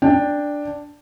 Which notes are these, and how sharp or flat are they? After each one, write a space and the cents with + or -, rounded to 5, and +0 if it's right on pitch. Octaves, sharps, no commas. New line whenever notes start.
D4 +0 G5 +15